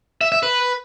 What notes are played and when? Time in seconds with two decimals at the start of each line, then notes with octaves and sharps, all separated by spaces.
0.21 E5
0.32 E5
0.43 B4